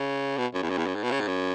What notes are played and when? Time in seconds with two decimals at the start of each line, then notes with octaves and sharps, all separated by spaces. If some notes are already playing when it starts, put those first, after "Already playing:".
Already playing: C#3
0.38 B2
0.54 F#2
0.62 E2
0.70 F#2
0.78 E2
0.87 F#2
0.95 G#2
1.03 B2
1.12 C#3
1.20 G#2
1.28 F#2